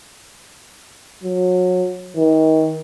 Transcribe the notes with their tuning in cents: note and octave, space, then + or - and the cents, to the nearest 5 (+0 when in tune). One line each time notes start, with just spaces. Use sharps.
F#3 -25
D#3 +30